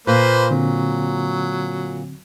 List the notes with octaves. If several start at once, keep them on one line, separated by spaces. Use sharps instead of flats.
A#2 A#3 B4 C5
D3 F#3 C4